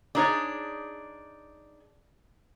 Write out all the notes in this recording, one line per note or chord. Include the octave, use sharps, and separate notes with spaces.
D4 D#4 G#4 A4 C#5 D5